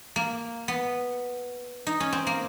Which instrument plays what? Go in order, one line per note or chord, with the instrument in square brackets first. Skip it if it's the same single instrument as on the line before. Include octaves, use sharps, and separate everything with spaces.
[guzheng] A#3
B3
D#4
C#4
C4
A#3